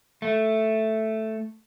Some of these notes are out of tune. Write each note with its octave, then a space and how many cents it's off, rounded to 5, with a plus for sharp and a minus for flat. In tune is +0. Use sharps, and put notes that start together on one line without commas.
A3 +0